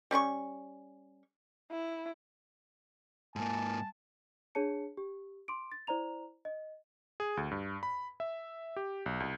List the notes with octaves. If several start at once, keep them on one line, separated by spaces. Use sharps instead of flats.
G3 C#4 B4 C#6
E4
G#2 A#3 G#5 A5
D4 G#4 C#5 A5 C#7
G4
C6 D6 D7
A6
E4 C5 D5 A#5 F7
D#5
G#4
D2
G2
B5
E5
G4
B1
C2